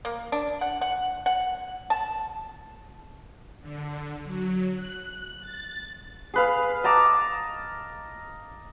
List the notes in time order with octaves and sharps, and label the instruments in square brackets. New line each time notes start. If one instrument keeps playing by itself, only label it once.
[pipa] A#3
D4
F#5
F#5
F#5
A5
[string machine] D3
F#3
F#6
A6
[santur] G#4 B4 F5
D#5 A5 A#5 D6